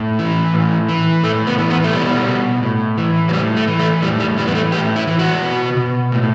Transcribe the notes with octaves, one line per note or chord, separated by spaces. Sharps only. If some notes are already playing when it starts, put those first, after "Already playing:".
Already playing: A2
E3
A2
E3
A2 A3
B3
E3
B3
A3
B2 G3
B2
A2
E3
F#3
A2 G3
A3
E3
A3
A2 G3
G3
E3 G3
B3
A3
A2 G4
E4
E3
F#4
B2
B2
A2